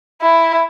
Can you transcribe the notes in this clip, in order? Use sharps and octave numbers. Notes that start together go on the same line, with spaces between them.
E4